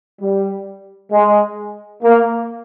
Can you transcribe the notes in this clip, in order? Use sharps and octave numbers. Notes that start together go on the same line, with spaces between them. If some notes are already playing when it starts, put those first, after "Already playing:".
G3
G#3
A#3